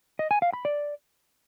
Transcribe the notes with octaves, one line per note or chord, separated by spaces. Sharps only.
D#5
G#5
F5
B5
D5